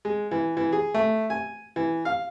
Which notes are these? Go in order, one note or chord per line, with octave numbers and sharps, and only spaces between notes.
G#3
E3
E3
G#4
A3
G#5
E3
F5